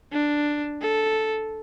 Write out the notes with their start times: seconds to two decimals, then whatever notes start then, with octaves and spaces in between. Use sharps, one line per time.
0.13 D4
0.82 A4